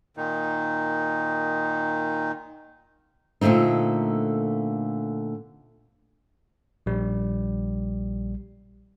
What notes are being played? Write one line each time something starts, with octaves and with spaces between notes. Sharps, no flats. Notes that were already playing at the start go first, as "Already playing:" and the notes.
A#2 D#3 D#4
A#2 D3 A3 C4 D#4
A#1 G3